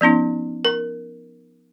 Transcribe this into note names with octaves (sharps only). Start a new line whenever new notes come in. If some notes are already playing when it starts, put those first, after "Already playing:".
F3 B3 C#4 D#4
A#4